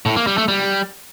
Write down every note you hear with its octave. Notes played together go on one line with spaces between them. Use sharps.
A2
A#3
G3
A3
G3